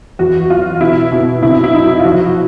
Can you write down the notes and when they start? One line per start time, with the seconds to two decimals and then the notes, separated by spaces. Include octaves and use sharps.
0.19 E2 F#4
0.50 F#3 F4
0.81 B2 E4
1.12 B2
1.42 C3 E4
1.64 E4
1.73 F#3 D#4
2.00 F4
2.04 F3 F#4